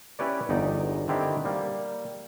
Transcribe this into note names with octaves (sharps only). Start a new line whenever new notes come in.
C#4 E4 G4 B4 C#5 D5
G1 E2 D#4 D5
D3 D#3 C4 E4 G4 D5
G3 A#3